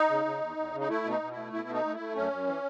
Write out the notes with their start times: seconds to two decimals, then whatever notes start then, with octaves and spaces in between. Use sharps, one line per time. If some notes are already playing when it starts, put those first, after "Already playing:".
Already playing: D#4
0.10 C#3
0.25 C#3
0.42 E2
0.57 E2
0.73 C#3
0.80 D#4
0.89 A3 E4
1.04 B2
1.10 D#4
1.21 B2
1.31 E4
1.37 A3
1.52 B2 E4
1.68 A3
1.74 D#4
1.84 A3
1.94 E4
2.00 A3
2.15 F#2 C#4
2.31 F#2
2.47 E3